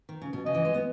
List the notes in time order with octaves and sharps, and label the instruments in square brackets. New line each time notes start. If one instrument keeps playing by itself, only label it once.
[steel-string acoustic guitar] D#3
C#3
B2
[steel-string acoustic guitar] C#3 [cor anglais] D#5
[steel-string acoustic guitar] E3
G#3
B3